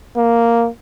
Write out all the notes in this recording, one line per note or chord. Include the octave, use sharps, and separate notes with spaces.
A#3